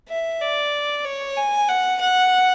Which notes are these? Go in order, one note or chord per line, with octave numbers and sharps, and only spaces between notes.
E5
D5
C#5
G#5
F#5
F#5